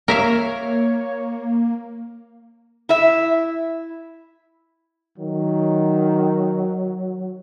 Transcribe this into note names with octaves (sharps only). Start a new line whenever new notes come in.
A#3 A#4 C#5 E5 F5
E4 E5
D#3 F#3